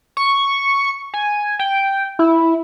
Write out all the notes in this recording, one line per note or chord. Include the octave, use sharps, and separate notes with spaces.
C#6
G#5
G5
E4